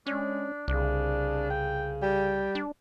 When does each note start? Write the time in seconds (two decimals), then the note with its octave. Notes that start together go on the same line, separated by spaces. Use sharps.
0.06 G#3 C#4 D4
0.68 C2 C#3 D4
1.50 G5
2.02 G3 G5
2.55 D4